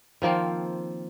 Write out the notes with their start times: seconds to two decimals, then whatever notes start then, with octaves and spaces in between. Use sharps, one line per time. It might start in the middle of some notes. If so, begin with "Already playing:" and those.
0.22 D#3 F3 A#3 C4